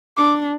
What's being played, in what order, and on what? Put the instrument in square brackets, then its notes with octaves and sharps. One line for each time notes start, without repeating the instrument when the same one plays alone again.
[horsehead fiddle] D4 [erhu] D6